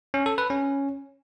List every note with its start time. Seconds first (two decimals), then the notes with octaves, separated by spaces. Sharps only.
0.14 C#4
0.26 A4
0.38 B4
0.50 C#4